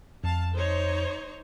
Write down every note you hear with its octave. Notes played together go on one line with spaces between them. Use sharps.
F2 F5 A5
D#4 C5 C#5